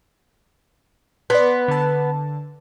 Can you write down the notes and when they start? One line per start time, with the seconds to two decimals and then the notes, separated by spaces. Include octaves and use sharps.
1.30 B3 D5 C6
1.68 D3 A5